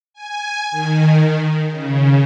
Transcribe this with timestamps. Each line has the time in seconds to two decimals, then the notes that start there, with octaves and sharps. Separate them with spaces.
0.14 G#5
0.71 D#3
1.68 C#3